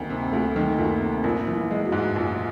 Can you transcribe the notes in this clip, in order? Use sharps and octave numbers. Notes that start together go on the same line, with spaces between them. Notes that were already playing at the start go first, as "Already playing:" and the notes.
Already playing: D2 D#3 A#3 C4
C3
D2 A3
D#3
D2 A#3
C3
A#1 A#3
E3
E4
G#3
F#4
G#2
A#1